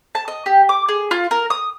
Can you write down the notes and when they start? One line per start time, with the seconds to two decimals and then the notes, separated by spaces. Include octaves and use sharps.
0.15 A5
0.28 D#5
0.46 G4
0.69 D6
0.88 G#4
1.11 F4
1.31 A#4
1.50 D#6